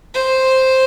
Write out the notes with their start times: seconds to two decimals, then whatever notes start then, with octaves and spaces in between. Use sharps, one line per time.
0.14 C5